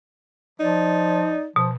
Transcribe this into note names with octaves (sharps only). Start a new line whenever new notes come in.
F3 D#4 D5
B2 F3